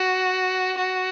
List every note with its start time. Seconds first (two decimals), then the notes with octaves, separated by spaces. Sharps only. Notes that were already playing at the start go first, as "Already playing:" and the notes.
Already playing: F#4
0.78 F#4